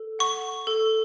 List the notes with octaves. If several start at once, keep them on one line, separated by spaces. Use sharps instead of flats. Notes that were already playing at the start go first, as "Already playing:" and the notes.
Already playing: A4
F#5 C#6
A4